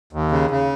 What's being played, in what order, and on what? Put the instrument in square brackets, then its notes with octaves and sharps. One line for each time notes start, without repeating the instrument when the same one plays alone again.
[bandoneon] D#2
C#3
C#3